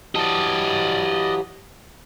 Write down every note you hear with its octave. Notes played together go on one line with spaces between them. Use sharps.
E3 F#3 G4 D5 D#5 A5